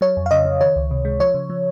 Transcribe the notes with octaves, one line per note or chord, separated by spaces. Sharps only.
F#3 C#5
F2
F5
C#3 D#5
C#3
D#3 C#5
C#2
C3
G#3
F3 C#5
C#3
F3